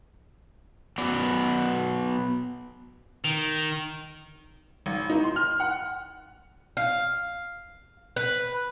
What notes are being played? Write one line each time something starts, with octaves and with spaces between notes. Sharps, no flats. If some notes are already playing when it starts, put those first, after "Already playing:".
F#3 B3 D5
D#3
G#1
D#4
C6
F6
F#5
F5
B4